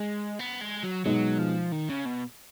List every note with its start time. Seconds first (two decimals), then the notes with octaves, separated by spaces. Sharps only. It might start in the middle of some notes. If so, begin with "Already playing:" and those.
Already playing: G#3
0.39 B3
0.61 G#3
0.84 F#3
1.05 B2 F#3 G#3 D#4
1.39 F3
1.72 D#3
1.89 C#3
2.05 B2